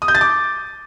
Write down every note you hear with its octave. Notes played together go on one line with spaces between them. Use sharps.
D#6
G6
A6
D6